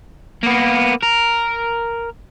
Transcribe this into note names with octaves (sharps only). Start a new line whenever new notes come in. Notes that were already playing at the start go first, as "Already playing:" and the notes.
A#3 B3
A#4